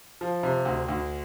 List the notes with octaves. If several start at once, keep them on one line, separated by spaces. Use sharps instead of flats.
F3
C3
D2
D2